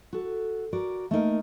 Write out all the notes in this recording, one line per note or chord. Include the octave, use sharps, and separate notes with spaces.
F#4 A4
F#4 A#4 D5
A3 A#3 D#4 A#4